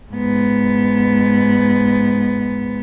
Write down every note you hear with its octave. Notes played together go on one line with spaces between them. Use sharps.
G#2 B3